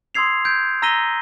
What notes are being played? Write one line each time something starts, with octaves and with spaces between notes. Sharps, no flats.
C6 D#6 E6 G#6 C7 F7
G6 G#6 D7
A#5 E6 A#6 B6 D#7 G7